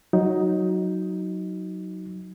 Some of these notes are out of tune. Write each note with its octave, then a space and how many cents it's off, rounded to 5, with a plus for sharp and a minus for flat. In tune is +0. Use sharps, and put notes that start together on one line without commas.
F#3 +0 D#4 +10